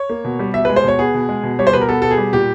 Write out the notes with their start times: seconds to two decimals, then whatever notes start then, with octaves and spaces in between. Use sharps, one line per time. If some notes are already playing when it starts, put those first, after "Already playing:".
Already playing: C#5
0.09 A#3
0.24 B2
0.39 G3
0.54 B2 E5
0.65 G#3 B4
0.76 C5
0.84 B2 C#5
0.99 B3 G#4
1.14 B2
1.29 G#3
1.43 B2
1.59 G3 C#5
1.67 C5
1.73 B2 B4
1.81 A#4
1.88 B3 A4
2.02 B2 A4
2.11 G#4
2.18 G3
2.33 A#2 G4